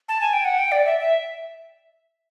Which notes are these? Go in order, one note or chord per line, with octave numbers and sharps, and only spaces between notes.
A5
G#5
G5
F#5
G5
D5
E5
E5